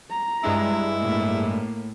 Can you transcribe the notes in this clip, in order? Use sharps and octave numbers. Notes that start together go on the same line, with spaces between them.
A#5
G2 G#3 D4 E4
A2 A#3